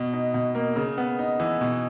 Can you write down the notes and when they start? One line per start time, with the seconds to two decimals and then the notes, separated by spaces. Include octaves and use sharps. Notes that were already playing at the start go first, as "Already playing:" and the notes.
Already playing: B2
0.13 D#4
0.34 B2
0.55 A#3
0.76 C#3
0.98 B3
1.19 D#4
1.40 E3
1.61 B2